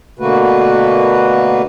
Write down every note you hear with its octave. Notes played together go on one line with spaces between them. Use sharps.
B2 D3 A3 A#3 F#4 B4